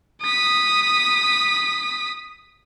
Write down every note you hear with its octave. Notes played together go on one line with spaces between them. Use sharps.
D#6 B6